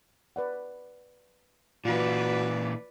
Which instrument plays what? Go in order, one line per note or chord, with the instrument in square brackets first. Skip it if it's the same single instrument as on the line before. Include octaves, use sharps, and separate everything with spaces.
[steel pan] B4 D5 F#5
[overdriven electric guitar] A#2 E3 [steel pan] F4 [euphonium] F#4 [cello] B4 D5